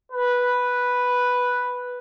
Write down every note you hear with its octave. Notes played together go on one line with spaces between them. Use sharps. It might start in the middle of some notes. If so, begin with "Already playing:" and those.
B4